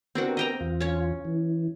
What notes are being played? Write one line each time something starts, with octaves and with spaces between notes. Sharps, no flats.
B3 C4 D4 F#4 G4 A#4
D#5 G5 A#5
E2 F4
C#4 C#5
E3